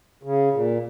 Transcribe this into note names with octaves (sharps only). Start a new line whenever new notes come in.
C#3
A#2